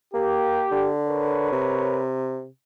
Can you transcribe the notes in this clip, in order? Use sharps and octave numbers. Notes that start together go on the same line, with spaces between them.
A#3 G4
D3
A#4 B4 C#5
C3